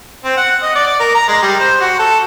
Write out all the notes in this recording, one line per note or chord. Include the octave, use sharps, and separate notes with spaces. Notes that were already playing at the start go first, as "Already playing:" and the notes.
C4
F#5
D#5
D5
D5
A#4
A#5
G#3
G3
C5
F#4
A4